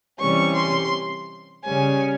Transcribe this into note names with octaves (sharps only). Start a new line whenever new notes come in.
C3 E3 G3 C#4 C#6
C6
C#3 G3 C#4 G#5